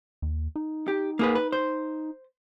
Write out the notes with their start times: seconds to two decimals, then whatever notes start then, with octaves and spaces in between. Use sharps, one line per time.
0.22 D#2
0.56 D#4
0.88 G4
1.19 A#3 G#4 B4
1.35 B4
1.52 C5